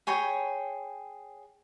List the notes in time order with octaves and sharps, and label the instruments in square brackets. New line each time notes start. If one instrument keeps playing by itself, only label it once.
[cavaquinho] G#4 C#5 G5 B5